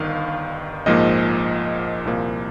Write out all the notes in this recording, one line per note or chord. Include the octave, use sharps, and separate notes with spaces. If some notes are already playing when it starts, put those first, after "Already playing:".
Already playing: G1 G2 D#3 F5
A#1 G#2 F3 A#3 D#5
C2 A#2 F3 A#3